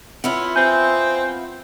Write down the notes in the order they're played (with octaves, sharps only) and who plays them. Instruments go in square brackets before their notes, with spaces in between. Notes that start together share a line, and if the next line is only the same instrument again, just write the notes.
[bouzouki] B3 E4 F4 [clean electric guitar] C4 C#5
[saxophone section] C4 [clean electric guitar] G#5 [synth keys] G6